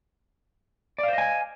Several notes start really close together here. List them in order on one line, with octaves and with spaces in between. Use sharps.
D5 F5 C5 D#5 G#5